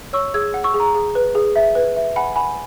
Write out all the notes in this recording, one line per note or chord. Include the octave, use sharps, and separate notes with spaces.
C#5 C#6 E6
G#4 E6 G#6
F#5
C#6 E6
G#4
A#5
G#4
B4
G#4
E5
B4
E5
F#5 G#5 B5
F#5 G#5 B5